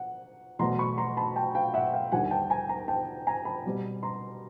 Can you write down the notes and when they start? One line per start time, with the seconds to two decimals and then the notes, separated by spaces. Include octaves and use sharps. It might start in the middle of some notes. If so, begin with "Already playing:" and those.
Already playing: F#5
0.59 E2 B2 F#3 A3 A#5 C6
0.79 B5 C#6
0.98 A#5 C6
1.17 A5 B5
1.36 G5 A5
1.55 F5 G5
1.74 E5 F#5
1.93 F5 G5
2.12 D#2 D3 G3 F#5 G#5
2.31 G5 A5
2.50 G#5 A#5
2.69 G#5 A#5
2.88 G5 A5
3.27 G#5 A#5
3.45 A5 B5
3.65 B2 G3 C4
4.03 A#5 C6